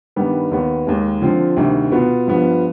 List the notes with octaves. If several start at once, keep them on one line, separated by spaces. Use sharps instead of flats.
G2 D#3 G3 B3
D#2 D#3 B3
D#2 D#3 G#3
D3 F3 C4 F4
D2 C3 D#3 G3 C4
B2 B3 F4
G2 F3 B3